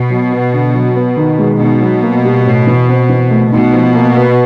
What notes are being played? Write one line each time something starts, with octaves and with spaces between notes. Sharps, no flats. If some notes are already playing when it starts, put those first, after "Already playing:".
Already playing: B2
F#3
B3
D3
F#3
B3
D#3
G#3
B2 D#4
F#3
A#3
G3
A2
E3
C4
E3
A3
B2 D#4
F3
A#3
B3